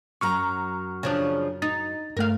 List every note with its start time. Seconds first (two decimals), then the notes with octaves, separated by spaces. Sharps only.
0.21 F#2 F#3 A#5 C#6 F6
1.03 C#3 F3 D4
1.62 D#4 A6
2.17 G2 A3 A#4 F5